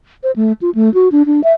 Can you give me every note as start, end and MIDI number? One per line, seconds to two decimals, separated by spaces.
0.23 0.31 72
0.36 0.52 57
0.62 0.70 65
0.75 0.92 57
0.94 1.09 66
1.12 1.23 62
1.26 1.43 62
1.44 1.53 76